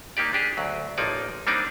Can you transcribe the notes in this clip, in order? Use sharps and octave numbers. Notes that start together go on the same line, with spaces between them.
A#3 D#4 G4 D5
D4 G4 G#4
D2 F#3
A1 F3 A#3 D#4 D5
G3 A#3 C4 D4 D#4 D5